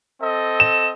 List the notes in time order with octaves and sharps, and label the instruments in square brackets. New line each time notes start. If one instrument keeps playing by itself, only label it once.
[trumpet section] C4 A4 D#5
[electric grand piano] E7